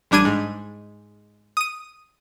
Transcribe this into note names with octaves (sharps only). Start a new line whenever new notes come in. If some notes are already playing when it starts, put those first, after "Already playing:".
A1 G3 D4 G#6 D#7
G#2
D#6 D#7